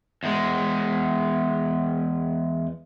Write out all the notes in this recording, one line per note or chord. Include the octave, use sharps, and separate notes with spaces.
E2 G#3